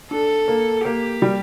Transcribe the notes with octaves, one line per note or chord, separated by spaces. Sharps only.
D4 A4
A#3
A#3 G4
G3